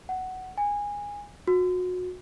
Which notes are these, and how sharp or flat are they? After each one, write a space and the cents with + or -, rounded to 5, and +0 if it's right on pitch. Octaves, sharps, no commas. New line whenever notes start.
F#5 +10
G#5 -20
F#4 -30